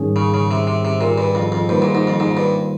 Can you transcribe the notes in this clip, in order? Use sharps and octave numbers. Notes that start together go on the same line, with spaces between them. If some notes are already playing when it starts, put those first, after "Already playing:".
Already playing: G#2 D#3 G3 C#4 G#4
C#3
C#3
C3
C3
C3
A#2
G2
F2
F2
G2 D#3 G3 A#3 F4 C5
G#2
G#2
F2
G#2
G2